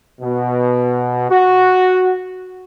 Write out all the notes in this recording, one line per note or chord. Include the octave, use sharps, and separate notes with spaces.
B2
F#4